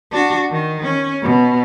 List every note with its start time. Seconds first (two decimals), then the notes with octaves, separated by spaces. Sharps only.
0.12 D4 F#4
0.51 D#3
0.83 C#4
1.22 B2